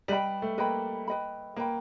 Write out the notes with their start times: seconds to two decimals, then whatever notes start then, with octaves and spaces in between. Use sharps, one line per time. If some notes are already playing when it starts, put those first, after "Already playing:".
0.08 G3 B4 D#5 G5 B5
0.42 A3
0.58 A#3 B4 D#5 G5 B5
1.08 B4 D#5 G5 B5
1.56 A#3 B4 D#5 G5 B5